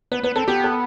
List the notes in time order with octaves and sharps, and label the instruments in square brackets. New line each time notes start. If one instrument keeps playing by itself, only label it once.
[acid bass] B3 [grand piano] B4
[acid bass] B3 [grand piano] B4
[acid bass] C4 [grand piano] A4
[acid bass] B3 [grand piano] G4
[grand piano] A4